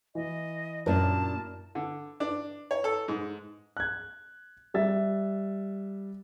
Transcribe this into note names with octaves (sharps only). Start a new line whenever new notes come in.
E3 D#5
F#2 A#2 D4 E4 A#4 D5 A5
D3
D4
C#5
A4
G#2
F#6 G#6
G3 E5 A6